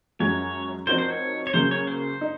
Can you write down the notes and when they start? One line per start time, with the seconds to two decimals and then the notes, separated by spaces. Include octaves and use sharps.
0.19 F#2 F3 G#3 C#4 F#4 C#5
0.87 F3 C4 D#4 F#4 A#4 C5
0.98 C5
1.10 C#5
1.47 C#5
1.54 C#3 F#3 A#3 C5
1.71 C#5
1.87 C5
2.21 D#4